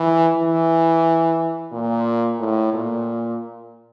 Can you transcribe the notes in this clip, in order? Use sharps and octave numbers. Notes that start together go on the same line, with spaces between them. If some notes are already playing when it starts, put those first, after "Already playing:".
Already playing: E3
E3
A#2
A2
A#2